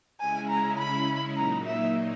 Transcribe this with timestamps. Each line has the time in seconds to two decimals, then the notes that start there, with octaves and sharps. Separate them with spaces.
0.20 C#3 G#3 C#4 E4 G#5
0.50 A#5
0.78 B5
1.37 A#2 F#3 A#3 D#4 A#5
1.66 E5